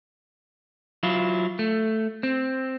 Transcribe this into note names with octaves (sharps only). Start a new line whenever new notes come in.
F#3 E4 F4
A3
C4